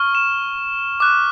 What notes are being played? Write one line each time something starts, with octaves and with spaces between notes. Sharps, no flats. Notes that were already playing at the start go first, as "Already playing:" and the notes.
Already playing: C#6 F6
E7
D6 F#6